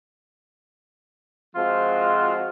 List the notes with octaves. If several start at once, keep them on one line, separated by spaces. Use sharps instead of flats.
F3 G#3 C4 F4 F#4